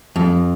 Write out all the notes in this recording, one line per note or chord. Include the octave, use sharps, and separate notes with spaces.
F2